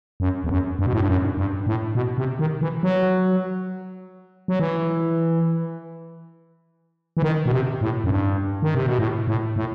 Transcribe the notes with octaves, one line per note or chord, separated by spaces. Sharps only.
F#2
E2
F#2
G2
B2
A2
G2
F#2
G2
A2
B2
C3
D#3
E3
F#3
F#3
E3
E3
D#3
B2
C3
A2
F#2
G2
D#3
C3
B2
A2
A2
A2